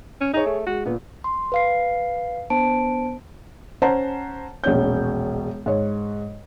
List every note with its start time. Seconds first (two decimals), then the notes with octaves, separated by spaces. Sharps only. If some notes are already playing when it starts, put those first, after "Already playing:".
0.21 C#4
0.33 D#4 G#4 C#5
0.46 A3
0.66 G#3 F#4
0.86 A#2 B3
1.24 C6
1.52 B4 F5 C7
2.50 B3 D4 C5 A5 D7
3.82 C#4 C5 F#5 A5 A#5
4.64 E1 A#1 C#4 C#5 G6
5.66 G#2 C#5